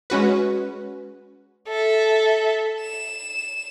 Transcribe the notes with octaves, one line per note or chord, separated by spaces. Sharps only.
G#3 C#4 F#4 B4
A4 E5
E7